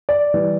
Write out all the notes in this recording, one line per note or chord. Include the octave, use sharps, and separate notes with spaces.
D5
E3 G3